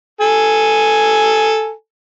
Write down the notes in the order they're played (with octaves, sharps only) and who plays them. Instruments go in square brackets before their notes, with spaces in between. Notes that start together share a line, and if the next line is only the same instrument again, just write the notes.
[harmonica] A4 G#5